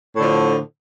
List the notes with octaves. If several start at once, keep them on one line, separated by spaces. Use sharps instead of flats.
A2 D3 F3